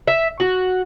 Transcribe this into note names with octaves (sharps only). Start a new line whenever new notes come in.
E5
F#4